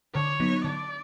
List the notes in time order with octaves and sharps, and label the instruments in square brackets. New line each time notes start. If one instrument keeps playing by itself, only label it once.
[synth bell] D3 [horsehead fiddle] C#5
[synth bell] F#3 B3 D#4
[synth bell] D3 [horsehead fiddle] D5